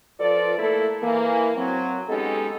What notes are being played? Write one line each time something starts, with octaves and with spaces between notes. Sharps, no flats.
F3 F4 A4 B4 D5
A3 A#3 E4 A4
E3 A#3
F#3 C4
G#3 B3 C#4 D#4 G4 A4